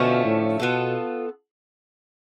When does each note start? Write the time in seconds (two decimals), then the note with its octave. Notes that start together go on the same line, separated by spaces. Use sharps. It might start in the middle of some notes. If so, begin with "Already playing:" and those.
Already playing: B2 D3 F3 A3 C#4
0.25 A2
0.60 B2 B3 F4 A4